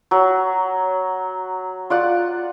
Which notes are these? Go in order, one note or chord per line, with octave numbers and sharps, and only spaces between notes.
F#3
F4 D5 F#5